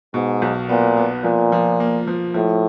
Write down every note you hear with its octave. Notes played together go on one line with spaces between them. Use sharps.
G#2 B2
B1
A#2 B3
B3
A#2 F3
F3
A#3
F3
A2 F3